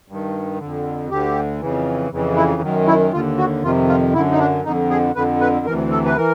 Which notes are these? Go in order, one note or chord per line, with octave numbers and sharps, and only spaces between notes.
G2 D#3
F2 D3
D2 D3 G4
F2 C#3 E3
F2 C#3 E3
E4
F#2 D#3
E4
D#2 D3 F4
F#4
F2 C3 D#3 F4
F4
F#2 D3 E4
D#4
D4
F2 D3 D#4
G#4
F2 D3 B4
B4
D2 C3 E3 A#4
A4
B4
E3 A#4